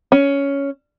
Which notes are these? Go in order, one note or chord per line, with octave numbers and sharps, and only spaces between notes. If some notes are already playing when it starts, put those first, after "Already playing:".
C#4